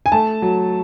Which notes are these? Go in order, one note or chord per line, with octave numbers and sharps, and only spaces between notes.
G#5
A3 A5
F#3